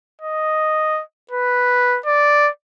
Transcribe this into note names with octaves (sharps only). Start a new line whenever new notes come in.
D#5
B4
D5